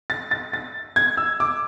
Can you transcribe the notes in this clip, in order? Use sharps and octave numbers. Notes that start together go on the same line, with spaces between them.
A6
A6
A6
G#6
E6
D6